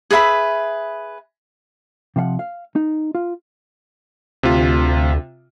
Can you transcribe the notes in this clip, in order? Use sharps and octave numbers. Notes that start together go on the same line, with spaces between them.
G#4 B4 E5 B5
C3 F3 F5 F#5
F5
D#4
F4
D2 C3 F4